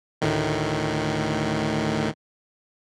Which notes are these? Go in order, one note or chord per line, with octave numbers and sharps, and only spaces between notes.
D2 A2 D#3